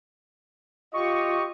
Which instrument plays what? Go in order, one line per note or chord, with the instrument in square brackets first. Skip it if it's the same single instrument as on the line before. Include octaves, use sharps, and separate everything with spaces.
[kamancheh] F4 [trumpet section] G4 D#5 [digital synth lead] C#6